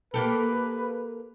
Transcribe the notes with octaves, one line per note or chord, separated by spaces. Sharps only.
A#3 G4 A4 B4